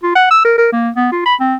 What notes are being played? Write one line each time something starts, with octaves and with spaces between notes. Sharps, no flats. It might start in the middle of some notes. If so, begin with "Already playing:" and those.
F4
F#5
E6
A#4
A#4
A#3
B3
F4
B5
C4